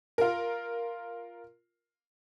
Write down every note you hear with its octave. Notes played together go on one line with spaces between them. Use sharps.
F4 A#4